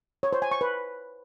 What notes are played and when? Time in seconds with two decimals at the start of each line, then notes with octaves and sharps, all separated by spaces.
0.23 C#5
0.33 C5
0.42 G#5
0.51 C#6
0.61 B4